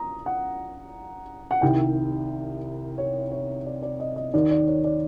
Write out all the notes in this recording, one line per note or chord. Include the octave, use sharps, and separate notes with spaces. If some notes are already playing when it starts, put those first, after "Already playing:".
Already playing: A#5 D#6
F#5
F#5
C2 C3 D#3 G5
C#5
C#5
D5
D5
D#5
D#5
D#2 D#3 D5
D5
C#5
D5